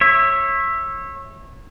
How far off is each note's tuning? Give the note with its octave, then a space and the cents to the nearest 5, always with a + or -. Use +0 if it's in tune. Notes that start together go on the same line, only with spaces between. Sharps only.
C#5 -25 E5 +0